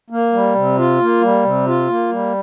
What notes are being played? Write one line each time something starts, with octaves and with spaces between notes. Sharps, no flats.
A#3
G3
C3
F4
A#3
G3
C3
F4
A#3
G3